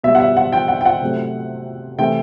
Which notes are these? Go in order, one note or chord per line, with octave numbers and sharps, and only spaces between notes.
B2 G3 E5
F#5
E5
F#5
G5
F#5
G5
F#5
C3 F#3 A3
C3 E3 A3 G5